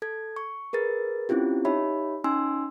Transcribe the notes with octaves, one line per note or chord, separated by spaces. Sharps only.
A4 G#6
C#6
G#4 A#4 B4 A6
C4 C#4 E4 F4 G4
D#4 G4 C#5 E5 B5
C#4 D#4 G#5 C6 E6